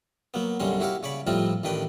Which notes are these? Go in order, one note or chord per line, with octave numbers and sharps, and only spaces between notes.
F#3 A#3 B3
B1 F#2 D3 G3 C#4 C6
E4 F#4 G4 C#5 F5
C#3 C#5 D5 B5
A2 F3 G3 C4 D#4 F4
A1 D#3 D4 B4 G5